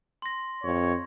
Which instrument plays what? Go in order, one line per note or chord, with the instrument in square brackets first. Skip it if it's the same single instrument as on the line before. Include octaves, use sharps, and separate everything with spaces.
[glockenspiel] C6 A#6
[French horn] F2 [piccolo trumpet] C#5